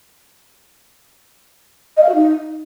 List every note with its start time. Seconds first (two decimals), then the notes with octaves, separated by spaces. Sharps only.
1.96 D#5
2.02 F5
2.08 F#4
2.14 D#4